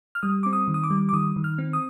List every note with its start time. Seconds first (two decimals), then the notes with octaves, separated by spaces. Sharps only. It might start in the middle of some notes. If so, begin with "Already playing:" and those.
0.15 F6
0.23 G3 D#6
0.43 C4 D6
0.53 D#6
0.68 D#3
0.74 D#6
0.84 D6
0.90 G3
1.09 D6
1.13 D#3 D#6
1.36 D#3
1.44 F6
1.58 C4
1.73 D#6